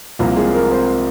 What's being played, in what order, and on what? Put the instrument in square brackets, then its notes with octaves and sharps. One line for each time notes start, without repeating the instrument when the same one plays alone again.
[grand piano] C2 C3 F3 A#3 A#4
G#3 G#4
A#3 A#4
C4 C5